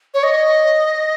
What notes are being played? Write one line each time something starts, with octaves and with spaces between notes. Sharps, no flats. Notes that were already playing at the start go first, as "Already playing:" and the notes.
C#5
D#5